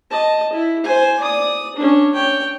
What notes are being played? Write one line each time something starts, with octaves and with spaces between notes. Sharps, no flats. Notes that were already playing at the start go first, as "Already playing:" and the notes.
D#5 A5
E4
C5 G#5
D5 D#6
C#4 D4
C#5 G5